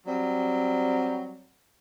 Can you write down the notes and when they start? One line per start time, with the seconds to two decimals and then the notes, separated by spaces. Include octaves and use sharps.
0.07 F#3 G3 C4